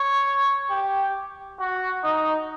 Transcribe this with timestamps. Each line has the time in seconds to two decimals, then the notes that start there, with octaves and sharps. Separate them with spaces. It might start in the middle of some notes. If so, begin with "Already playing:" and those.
Already playing: C#5
0.70 G4
1.60 F#4
2.04 D#4